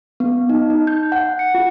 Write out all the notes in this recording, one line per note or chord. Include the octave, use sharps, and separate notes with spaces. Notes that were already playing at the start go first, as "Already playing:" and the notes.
B3
D#4
D#4
G6
F#5
C#7
F4